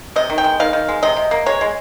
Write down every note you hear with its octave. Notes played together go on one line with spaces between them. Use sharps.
C3 D#5
D#3
G5
G#3
D#3 F5
D#3
G#3
C3 D#5
C3
A#3
G#3 C#5
G#3